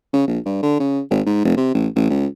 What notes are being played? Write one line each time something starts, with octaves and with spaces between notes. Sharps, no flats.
C#3
A#1
G2
D3
C#3
G#1
G#2
F1
C3
A1
A1
C#2